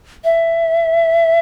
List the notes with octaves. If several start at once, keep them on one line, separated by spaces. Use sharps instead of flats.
E5